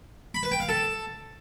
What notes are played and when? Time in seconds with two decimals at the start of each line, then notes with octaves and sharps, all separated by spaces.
0.35 B5
0.43 B4
0.52 G5
0.60 F5
0.69 A4